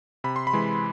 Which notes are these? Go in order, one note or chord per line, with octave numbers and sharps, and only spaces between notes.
C3 B5
C6
B5
E3 G#3